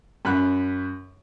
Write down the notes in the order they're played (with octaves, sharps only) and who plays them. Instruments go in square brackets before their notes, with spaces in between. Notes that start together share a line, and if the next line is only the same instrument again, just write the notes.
[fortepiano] F#2 B5 F#6